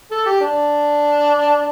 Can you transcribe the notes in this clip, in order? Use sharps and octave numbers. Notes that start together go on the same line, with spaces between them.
A4
G4
D4